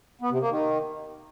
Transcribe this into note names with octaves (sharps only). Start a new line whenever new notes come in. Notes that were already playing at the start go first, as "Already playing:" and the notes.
B3
C3
A#3
D#3